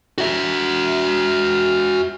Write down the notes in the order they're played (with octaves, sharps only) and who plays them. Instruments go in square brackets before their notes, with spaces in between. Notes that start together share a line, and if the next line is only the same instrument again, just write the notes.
[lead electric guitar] F#4 E5